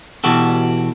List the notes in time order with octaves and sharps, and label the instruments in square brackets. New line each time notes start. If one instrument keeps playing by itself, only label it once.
[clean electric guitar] B2 E3 F#4 G4 A4